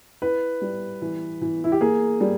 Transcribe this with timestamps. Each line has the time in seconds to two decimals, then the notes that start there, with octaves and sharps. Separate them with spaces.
0.22 E4 B4
0.61 G3
1.02 E3
1.41 E3
1.64 E4
1.72 G4
1.81 A#3 G#4
2.21 G3